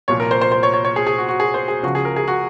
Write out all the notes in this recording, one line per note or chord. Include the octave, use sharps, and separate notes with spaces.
C2 A#2 F3 C#5
A#4
C5
C5
C5
C#5
C#5
C#5
G#4
G#4
F#4
F#4
G#4
C5
G#4
C#2 C#3 F3 F#4
G#4
A#4
G#4
F#4